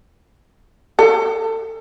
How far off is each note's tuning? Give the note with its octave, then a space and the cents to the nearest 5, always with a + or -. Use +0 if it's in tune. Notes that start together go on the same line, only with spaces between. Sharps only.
A4 +30